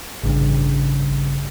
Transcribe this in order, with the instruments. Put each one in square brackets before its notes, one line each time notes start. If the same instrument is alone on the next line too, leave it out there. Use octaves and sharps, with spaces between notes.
[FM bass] A1 [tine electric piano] G2 C#3